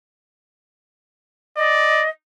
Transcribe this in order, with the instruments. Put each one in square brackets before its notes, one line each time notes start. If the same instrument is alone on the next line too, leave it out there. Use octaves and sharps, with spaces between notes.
[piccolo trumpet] D5 [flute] D#5